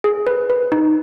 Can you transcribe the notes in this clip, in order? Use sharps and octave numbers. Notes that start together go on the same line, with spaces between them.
G#4
B4
B4
D#4